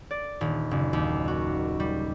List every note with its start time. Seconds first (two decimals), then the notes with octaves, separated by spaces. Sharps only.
0.11 D5
0.41 D#1
0.71 F#1
0.93 D#2
1.28 F#4
1.80 G3